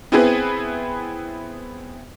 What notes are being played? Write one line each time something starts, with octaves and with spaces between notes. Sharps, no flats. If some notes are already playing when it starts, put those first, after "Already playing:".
B3 C4 E4 G#4 B4